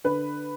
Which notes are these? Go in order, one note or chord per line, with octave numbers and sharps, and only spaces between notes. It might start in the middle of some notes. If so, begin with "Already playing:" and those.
D3 B4